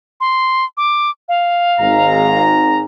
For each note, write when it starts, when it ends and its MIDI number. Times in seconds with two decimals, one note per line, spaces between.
0.20 0.65 84
0.77 1.11 86
1.29 2.43 77
1.79 2.83 32
1.79 2.83 44
1.79 2.83 82